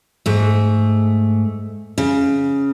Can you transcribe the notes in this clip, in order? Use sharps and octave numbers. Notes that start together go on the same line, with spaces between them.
G#2 A3
C#3